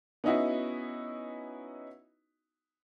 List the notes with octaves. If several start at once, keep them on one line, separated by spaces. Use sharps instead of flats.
B3 C#4 D#4 E4 F#4